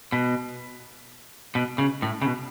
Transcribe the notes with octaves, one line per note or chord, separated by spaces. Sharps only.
B2
B2
C#3
A2
C#3
B2